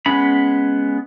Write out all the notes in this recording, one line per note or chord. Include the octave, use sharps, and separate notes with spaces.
G#3 B3 C#4 B5